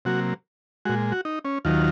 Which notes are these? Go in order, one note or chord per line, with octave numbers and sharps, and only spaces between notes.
C3 F#3 A#3 F#4
A#2 G#3 F#4
F#4
D#4
C#4
D#2 D#3 F#3 F4